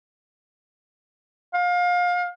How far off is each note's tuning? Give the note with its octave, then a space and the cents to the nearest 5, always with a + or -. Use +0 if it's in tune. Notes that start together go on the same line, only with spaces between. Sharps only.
F5 +30